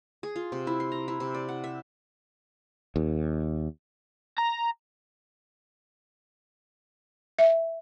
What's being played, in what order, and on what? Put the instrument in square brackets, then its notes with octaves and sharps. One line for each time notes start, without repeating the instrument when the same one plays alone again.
[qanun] G#4
F4
C3
E4
C6
A#5
E4
C3
D5
F#5
E5
[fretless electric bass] D#2
[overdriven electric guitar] A#5
[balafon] E5